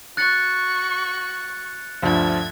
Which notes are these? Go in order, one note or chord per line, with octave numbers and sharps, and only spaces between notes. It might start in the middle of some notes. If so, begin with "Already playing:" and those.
F#4 C#6 F#6 A6 C#7
D2 G2 F3 E5 G#6